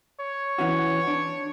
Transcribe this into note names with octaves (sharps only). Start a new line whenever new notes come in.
C#5
E3 C#4 F#4
D4